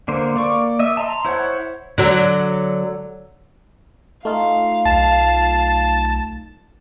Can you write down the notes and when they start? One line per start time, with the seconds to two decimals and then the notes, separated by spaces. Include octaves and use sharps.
0.08 D3 A#3 C5
0.36 A#3 D5 C#6
0.79 D#5 E5
0.97 A5 A#5 C6
1.25 E4 C5 C#5 F#5
1.98 D3 F#3
4.25 A3 D#4 F4 F5
4.86 B1 A5